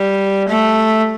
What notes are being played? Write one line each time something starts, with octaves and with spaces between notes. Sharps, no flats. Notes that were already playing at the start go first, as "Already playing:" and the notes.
Already playing: G3
A3